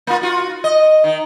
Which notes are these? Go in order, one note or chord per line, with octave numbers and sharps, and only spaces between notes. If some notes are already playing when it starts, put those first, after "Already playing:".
A#3 F4
F4 F#4
D#5
D#3